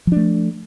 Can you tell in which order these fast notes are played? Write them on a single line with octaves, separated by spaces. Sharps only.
F3 D4 A3